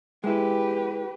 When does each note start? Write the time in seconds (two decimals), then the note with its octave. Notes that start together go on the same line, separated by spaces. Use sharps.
0.24 G#3 E4 G4 B4